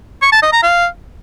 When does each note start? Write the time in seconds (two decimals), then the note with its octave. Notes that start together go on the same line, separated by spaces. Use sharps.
0.22 C#6
0.32 A5
0.43 D#5
0.53 A#5
0.63 F5